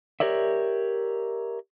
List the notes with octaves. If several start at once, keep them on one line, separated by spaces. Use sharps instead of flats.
G4 A#4 C#5 D5 E5